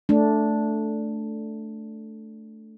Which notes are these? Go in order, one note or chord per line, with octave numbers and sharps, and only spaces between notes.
A3 D4